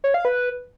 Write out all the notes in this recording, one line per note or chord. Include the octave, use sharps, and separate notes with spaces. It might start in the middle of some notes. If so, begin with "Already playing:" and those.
C#5
F5
B4